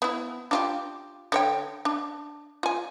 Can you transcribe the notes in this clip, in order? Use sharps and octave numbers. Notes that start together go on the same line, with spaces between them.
B3 E4
D4 F4 G4
D3 C#5 G5
D4
F4 G#5